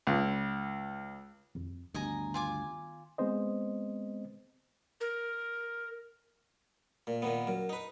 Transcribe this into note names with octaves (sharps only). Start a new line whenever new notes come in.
C#2
F2
D2 G2 D#3 B3 D#5 G#5 A#5
F4 G#5 D6
G#3 B3 C4 C5 D#5
A#4
A#2
A#2 D#3 B3
F#2
D#4 B4